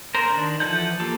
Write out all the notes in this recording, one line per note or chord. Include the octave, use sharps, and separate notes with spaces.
A#4 C5
D#3 D4
E3 F3 A4 F#5 G6
A#3 F4 G4 A4